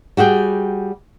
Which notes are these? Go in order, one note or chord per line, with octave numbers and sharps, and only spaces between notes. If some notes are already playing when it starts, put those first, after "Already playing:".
G3 F#4 G#4 G5